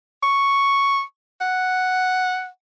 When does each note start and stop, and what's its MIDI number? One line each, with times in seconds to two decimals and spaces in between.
0.23 1.02 85
1.41 2.47 78